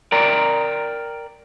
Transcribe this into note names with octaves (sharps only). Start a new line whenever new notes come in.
A#4 D5 G5 A#5